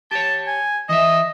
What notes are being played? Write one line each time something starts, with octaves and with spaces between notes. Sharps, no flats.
G4 C#5 A5
G#5
E3 D#5 E5